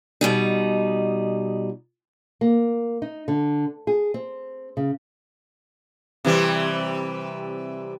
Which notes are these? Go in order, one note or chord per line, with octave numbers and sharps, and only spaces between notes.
B2 G3 D#4
A#3
D#4
D3
G#4
C4
C#3
C3 E3 G3